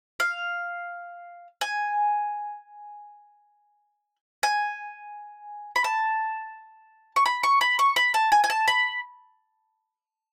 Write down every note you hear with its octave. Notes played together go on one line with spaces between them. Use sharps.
F5
G#5
G#5
B5
A5
C#6
B5
C#6
B5
C#6
B5
A5
G#5
G#5
A5
B5